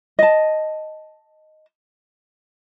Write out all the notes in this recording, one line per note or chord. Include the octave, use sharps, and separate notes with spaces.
D#5 A5